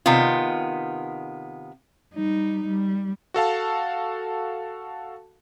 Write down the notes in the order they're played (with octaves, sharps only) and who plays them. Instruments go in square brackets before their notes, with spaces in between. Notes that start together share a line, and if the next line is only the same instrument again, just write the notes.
[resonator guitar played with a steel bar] C3 D#3 B3 F4
[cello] G3 D#4
G3
[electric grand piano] F#4 A4 F5 A5